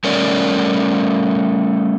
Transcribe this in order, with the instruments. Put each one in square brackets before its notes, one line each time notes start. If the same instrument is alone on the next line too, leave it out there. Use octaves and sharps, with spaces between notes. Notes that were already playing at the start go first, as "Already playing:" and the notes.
[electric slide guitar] G3 A3 C#4 A#4 C#5 D5